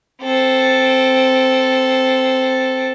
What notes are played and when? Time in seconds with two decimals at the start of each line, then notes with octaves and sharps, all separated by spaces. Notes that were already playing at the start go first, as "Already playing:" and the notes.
0.21 C4 A4